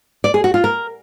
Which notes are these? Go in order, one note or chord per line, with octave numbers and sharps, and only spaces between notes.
D5
G#4
F#4
F4
A#4